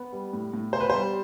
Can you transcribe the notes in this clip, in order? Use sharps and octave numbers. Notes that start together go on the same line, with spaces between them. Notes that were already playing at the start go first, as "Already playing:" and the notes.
Already playing: B3
G3
A2
A2
B3 C5
B4
G3 C5